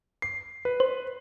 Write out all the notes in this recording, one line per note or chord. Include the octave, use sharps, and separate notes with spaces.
C7
B4
C5